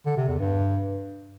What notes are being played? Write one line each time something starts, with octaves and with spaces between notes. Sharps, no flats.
D3
C3
E2
G2